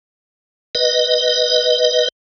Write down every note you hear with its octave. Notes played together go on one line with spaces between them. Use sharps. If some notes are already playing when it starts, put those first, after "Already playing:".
B4 D#5